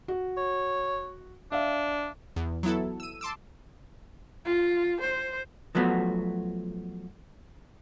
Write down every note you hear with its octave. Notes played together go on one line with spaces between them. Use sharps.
F#4
C#5
D4 E5 F5
E2
F#3 B3 E4 A4
E6 D#7
A5 C6 D6 E6
F4
C5
F3 F#3 A3 B3 F#4